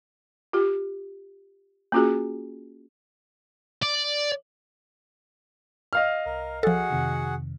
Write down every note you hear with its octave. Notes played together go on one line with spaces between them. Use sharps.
F4 G4
A#3 C#4 F4 F#4 G#4
D5
D#5 F5 F6
C2 A#4
F3 F#4 G#4 A4 F#5
F2 C3 D#3